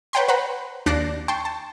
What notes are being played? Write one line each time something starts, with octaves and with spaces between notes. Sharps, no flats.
B4 C#5 F#5 G5 A#5 C6
B4 C5 F#5 A#5 B5
D#2 D4 F#6 A#6 C7 D7
G5 A5 C6 C#6
A5